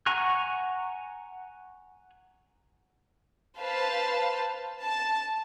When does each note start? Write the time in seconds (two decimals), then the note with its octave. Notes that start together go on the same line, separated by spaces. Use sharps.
0.06 F#5 G#5 A#5 C#6 F#6
3.59 B4 C5 F5 A5
4.82 A5